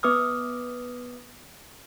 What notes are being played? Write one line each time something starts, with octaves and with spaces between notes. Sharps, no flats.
B3 B4 D6 D#6 F6